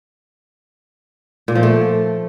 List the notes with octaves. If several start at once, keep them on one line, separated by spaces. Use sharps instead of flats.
A#2
F3
A3